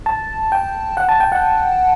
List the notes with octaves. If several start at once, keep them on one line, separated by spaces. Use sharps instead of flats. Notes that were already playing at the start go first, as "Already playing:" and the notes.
A5
G5
F#5
A5
G5
F#5